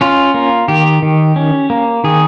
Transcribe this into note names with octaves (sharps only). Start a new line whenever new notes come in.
C#4 F4
A#3
D#3 G4
D#3
C#4
A#3
D#3 G#4